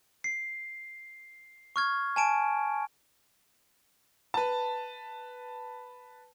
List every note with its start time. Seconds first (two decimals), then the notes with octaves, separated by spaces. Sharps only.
0.24 C7
1.76 C#6 F6 G#6
2.16 G#5 A5 D7
4.34 B4 A5